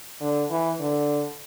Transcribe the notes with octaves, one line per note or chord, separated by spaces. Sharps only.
D3
E3
D3